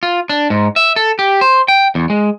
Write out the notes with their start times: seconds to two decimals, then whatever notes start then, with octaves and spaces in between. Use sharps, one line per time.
0.03 F4
0.29 D4
0.50 G#2
0.76 E5
0.96 A4
1.19 G4
1.41 C5
1.68 G5
1.95 E2
2.10 G#3